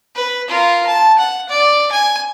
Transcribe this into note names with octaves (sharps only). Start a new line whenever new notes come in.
B4
F4 A#4
A5
F#5
D5
G#5